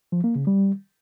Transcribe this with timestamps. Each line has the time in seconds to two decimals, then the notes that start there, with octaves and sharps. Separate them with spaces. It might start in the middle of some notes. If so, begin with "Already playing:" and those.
0.12 F3
0.24 A#3
0.35 C#3
0.47 G3